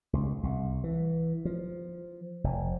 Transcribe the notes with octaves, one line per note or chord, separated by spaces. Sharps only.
C#2
C2
E3
F3
F1